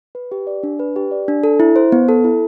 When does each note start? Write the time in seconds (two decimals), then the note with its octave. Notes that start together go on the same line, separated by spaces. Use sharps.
0.15 B4
0.32 G4
0.47 D5
0.63 D4
0.79 B4
0.96 G4
1.11 D5
1.28 D4
1.44 A4
1.60 E4
1.76 C5
1.92 B3
2.09 A4
2.24 E4